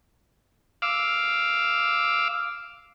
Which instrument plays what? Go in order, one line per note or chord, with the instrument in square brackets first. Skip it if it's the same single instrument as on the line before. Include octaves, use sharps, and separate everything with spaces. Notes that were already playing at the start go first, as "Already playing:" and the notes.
[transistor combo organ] F5 D6 E6